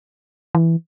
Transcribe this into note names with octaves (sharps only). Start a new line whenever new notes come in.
E3